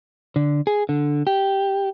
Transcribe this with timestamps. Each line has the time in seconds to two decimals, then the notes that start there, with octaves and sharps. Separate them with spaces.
0.36 D3
0.67 G#4
0.89 D3
1.27 G4